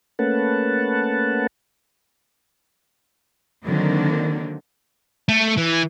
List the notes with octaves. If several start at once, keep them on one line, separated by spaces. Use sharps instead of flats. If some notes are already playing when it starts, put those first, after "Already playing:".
A3 A#3 C#4 B4 F#5 A5
D3 D#3 F#3 A#3 C4
A3
E3